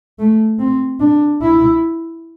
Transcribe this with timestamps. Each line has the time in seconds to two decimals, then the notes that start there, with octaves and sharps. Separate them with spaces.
0.19 A3
0.59 C4
1.00 D4
1.42 E4